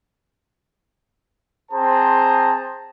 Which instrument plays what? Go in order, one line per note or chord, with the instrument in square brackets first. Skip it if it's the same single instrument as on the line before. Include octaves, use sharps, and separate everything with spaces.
[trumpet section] C4 G#4 C5 A5 A#5